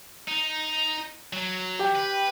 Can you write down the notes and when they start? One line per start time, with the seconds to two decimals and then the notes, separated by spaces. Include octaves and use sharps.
0.27 D#4
1.33 F#3
1.79 G4 G5
1.95 B4